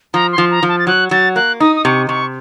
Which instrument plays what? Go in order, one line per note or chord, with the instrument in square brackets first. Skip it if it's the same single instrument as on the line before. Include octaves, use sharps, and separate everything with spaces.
[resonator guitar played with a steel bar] F3 [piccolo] A#5
[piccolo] C6
[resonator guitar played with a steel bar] F3
[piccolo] A#5
[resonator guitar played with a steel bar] F3
[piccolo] A5
A6
[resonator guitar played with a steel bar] F#3 [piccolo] F#6
[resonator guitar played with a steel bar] F#3 [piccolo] A6
[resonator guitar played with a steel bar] A#3 [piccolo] F#6
[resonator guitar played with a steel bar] D#4 [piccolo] D#6
[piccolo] D#6
[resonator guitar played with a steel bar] C3 [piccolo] C#6
[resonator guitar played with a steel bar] C3 [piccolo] C#6